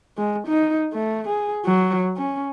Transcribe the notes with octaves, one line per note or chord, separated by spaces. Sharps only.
G#3
D#4
A3
G#4
F#3
C#4